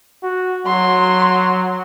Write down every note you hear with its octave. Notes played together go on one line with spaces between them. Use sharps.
F#4
F#3 C6